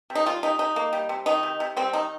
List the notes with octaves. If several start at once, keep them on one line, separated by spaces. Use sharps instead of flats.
C3
D#4
G3 F4
C3 D#4
C3 D#4
A#3
G3
C3
D#3 D#4
C3
C3
G3 C4
D#3 D#4